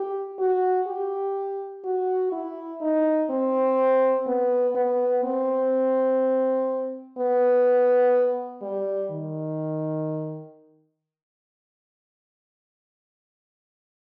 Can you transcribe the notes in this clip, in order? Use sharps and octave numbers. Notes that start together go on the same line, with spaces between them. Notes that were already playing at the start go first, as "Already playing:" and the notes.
Already playing: G4
F#4
G4
F#4
E4
D#4
C4
B3
B3
C4
B3
G3
D#3